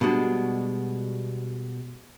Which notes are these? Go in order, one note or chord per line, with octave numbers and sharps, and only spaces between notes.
B2 G3 G#3 D4 F#4